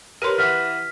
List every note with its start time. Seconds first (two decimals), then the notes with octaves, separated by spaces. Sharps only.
0.22 G4 A#4 B4 C#5 C6
0.38 E3 B4 F#5 F6 B6